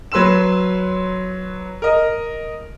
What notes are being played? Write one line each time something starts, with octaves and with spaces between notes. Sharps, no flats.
F#3 B4 C6 E6 E7
A#4 D#5